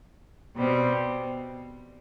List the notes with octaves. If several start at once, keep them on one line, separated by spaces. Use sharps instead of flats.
B2 G3 C4